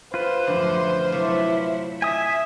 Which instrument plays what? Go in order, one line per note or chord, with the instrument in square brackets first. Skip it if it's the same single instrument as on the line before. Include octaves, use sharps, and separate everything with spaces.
[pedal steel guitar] F4 B4 [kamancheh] C5
[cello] F#2 F3 [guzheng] A2 D3 E3
[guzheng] C3 A3 [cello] F#3 E4
[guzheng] D#5 [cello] E5 [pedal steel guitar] G#5 D#6